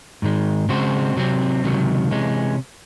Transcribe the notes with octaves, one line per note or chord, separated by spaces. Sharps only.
G#2 D#3 G#3
C#3 G#3 C4 F#4 C5
C3 F#3 C4
C#2 C3 D#3 F#3
C3 E3 G#3 C#4